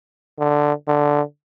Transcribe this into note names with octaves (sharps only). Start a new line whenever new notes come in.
D3
D3